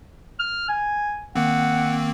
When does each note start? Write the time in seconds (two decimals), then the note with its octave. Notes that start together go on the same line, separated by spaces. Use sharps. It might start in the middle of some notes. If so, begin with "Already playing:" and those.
0.40 F6
0.69 G#5
1.35 D#3 A#3 C4 F#5